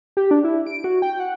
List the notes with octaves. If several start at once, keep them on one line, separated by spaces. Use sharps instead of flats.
G4
D4
E4
D7
F#4
G5
F#5